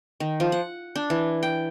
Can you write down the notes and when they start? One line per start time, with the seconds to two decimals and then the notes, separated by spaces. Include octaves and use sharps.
0.20 D#3
0.40 F3
0.52 F#5
0.95 D4
1.10 E3
1.43 G5